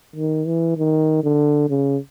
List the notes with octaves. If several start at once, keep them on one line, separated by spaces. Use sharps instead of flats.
D#3
E3
D#3
D3
C#3